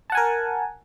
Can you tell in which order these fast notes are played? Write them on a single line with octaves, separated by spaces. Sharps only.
A5 F#5 G#5 A#4